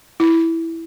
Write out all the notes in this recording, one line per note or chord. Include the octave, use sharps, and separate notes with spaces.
E4